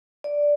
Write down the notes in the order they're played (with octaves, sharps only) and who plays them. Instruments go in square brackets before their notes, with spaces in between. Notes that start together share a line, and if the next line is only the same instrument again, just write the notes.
[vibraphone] D5